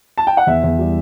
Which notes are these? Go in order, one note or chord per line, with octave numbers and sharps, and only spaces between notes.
A5
G5
F#5
E2 E5
E2
G3